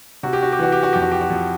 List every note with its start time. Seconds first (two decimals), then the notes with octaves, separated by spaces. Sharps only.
0.23 C3 F#4
0.33 G4
0.42 F#4
0.52 G4
0.59 E3 F#4
0.72 G4
0.83 F#4
0.93 F2 G4
1.02 F#4
1.11 G4
1.21 F#4
1.30 F2